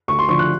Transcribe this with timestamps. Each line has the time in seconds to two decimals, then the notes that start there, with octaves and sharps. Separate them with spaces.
0.08 D2 C#6
0.19 C6
0.29 D3 F3 C#6
0.39 F#6